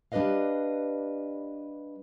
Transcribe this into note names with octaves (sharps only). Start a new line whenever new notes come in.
G3 D4 G4 B4 D#5 F5